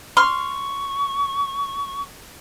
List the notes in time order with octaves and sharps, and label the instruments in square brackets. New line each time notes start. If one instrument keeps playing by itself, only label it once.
[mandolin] C6 F6 [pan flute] C#6